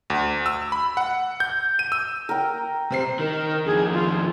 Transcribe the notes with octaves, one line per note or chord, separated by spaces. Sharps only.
D2
E6
B5
F#5
G6
D#7
E6
A#4 G5
C3 C4 C7
D#3 A#4
F2 D#3 G#4
F4